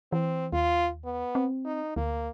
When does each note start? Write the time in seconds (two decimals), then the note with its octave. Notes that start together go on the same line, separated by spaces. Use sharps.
0.12 E3 C4
0.53 D#2 F4
1.05 B3
1.35 C4
1.65 D#4
1.96 D2 A#3